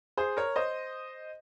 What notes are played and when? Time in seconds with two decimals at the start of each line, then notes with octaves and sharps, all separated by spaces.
0.17 G#4 C5
0.37 A#4 C#5
0.56 C5 D#5